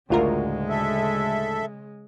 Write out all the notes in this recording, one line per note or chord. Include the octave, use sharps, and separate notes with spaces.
A1 D2 A2 C#3 G#3 F4 F#4 A#4
A4 E5